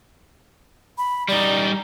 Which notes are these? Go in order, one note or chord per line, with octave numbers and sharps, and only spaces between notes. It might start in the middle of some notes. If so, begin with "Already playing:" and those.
B5
G3 D#4 D5